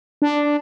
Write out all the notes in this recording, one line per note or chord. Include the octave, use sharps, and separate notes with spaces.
D4